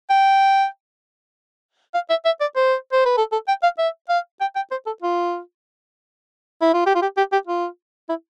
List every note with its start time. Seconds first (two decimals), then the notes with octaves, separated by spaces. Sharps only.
0.10 G5
1.94 F5
2.10 E5
2.25 E5
2.41 D5
2.56 C5
2.93 C5
3.06 B4
3.18 A4
3.32 A4
3.48 G5
3.63 F5
3.79 E5
4.09 F5
4.41 G5
4.56 G5
4.71 C5
4.86 A4
5.02 F4
6.62 E4
6.74 F4
6.86 G4
6.95 F4
7.02 G4
7.17 G4
7.32 G4
7.47 F4
8.09 E4